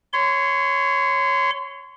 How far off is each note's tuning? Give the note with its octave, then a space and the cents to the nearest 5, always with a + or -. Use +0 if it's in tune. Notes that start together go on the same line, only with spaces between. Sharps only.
C#5 +0 C6 -30